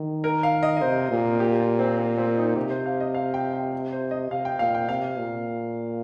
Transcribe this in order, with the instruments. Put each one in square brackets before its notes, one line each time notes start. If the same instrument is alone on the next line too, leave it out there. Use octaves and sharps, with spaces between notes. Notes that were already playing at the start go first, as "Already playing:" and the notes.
Already playing: [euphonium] D#3
[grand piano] A#4
F5
D#5
D#5
[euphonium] C3 [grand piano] C5
[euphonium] A#2
[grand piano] G4
F4
C4
C4
C4
D#4
[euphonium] C3 [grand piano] G4
[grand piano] C5
F5
D#5
F5
G5
G5
C5
D#5
[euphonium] C3 [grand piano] F5
[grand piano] G5
[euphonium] A#2 [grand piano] F5
[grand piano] G5
[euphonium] C3 [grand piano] F5
[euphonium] A#2